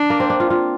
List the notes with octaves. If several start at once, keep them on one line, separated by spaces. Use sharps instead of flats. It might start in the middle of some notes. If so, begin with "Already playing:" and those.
Already playing: D4
A#3
C4
D4
F4
F4